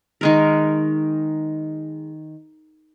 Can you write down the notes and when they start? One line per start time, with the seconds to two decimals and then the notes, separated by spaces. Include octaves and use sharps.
0.21 D#3 G#3 A#4